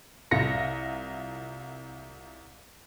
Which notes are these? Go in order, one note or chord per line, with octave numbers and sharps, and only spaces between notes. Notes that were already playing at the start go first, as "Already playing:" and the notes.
C2 F4 A#6 C#7